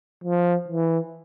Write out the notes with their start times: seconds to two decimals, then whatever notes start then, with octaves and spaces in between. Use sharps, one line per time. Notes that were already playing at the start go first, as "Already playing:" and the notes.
0.24 F3
0.68 E3